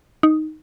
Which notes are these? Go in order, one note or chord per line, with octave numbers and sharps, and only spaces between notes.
D#4